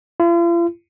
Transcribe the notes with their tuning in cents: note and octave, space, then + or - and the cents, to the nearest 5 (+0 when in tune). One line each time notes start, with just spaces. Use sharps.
F4 -45